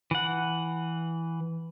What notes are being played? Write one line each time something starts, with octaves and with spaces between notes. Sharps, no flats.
E3 F#5